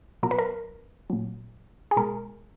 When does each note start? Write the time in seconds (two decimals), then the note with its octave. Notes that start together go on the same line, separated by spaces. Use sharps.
0.23 B2 F#3 A#4
0.31 B4
0.39 A#4
1.10 A#2 F#3
1.91 G#4
1.96 B2 G#3 A#4